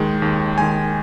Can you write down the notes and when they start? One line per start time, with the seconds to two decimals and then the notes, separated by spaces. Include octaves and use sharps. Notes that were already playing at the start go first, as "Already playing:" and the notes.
Already playing: D#2 D#3 G#3
0.22 D#2
0.58 D#3 G#3 G#5